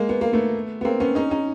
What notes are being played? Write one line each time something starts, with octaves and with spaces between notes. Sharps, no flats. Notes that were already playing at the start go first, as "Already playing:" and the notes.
Already playing: G#3 A#3
B3
A#3
A3 B3
B3
A#3 C4
B3 C#4
C#4 D#4
C#4 D#4